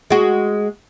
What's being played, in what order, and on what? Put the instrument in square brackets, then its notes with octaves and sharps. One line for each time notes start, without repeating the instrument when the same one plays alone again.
[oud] G#3 F#4